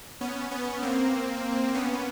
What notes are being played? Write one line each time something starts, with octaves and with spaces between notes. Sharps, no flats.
B3 C#4
B3 C#4
A#3 C4
B3 C#4